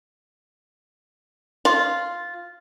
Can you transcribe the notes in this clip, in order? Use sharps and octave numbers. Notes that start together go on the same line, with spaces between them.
F4